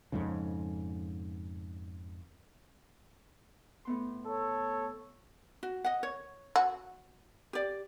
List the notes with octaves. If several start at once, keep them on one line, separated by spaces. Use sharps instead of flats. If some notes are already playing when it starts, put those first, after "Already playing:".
F2 G#2 C#3
A2 B3 C6
A4 C#5
F#4
D#5 F#5
C#5
F#4
G4 D5